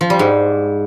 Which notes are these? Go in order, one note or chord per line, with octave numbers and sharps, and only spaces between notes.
F3
G3
G#2